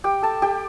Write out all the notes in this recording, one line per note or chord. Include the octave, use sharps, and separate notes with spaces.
G4 G5
A4 A5
G4 G5